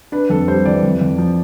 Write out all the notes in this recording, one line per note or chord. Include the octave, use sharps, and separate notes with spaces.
D4 B4
F2 A4
G3 C5
E3 D5
F2
F2
F3